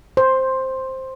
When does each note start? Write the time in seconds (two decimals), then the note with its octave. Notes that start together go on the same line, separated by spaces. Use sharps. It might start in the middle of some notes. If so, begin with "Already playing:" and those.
0.17 C5